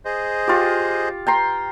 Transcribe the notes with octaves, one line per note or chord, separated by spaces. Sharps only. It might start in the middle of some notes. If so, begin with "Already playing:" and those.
G#4 C5 D#5
F4 G4
G5 A#5 C6